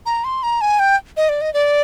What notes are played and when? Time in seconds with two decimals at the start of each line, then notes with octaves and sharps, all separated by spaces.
0.06 A#5
0.24 C6
0.43 A#5
0.61 G#5
0.79 G5
1.17 D#5
1.29 D5
1.41 D#5
1.54 D5